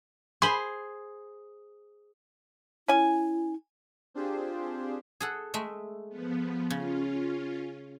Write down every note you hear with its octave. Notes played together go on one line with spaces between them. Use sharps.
G#4 C5 B5
C#4 E4 G#5
C4 D4 F4 G4 G#4 C5
G#4 A4 F#5
G#3 A3 E5
F3 B3
C#3 C#4 F4